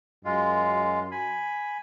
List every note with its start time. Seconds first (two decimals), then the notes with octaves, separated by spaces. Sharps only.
0.25 F#2 G#3 F4
1.11 G#5 B5